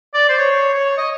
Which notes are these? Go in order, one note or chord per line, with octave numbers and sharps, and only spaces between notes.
D5
C5
C#5
C#5
D#5